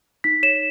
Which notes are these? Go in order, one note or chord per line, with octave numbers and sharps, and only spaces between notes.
D#4 B6
C#5 E7